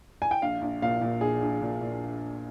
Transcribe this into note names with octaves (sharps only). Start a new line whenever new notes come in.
G#5
G5
A#1 F5
A#1
A#2 F5
A#2
A#1 G#4
A#1
A#2
A#2